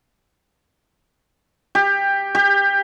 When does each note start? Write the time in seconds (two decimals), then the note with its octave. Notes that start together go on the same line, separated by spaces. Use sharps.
1.75 G4
2.35 G4